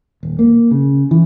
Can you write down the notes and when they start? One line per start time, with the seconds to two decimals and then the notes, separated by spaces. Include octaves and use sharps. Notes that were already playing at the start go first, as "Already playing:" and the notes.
0.23 D#1
0.39 A#3
0.71 C#3
1.11 E3